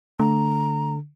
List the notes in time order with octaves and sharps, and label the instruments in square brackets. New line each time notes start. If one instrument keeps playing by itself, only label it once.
[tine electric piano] D3 [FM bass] A3 [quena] A#5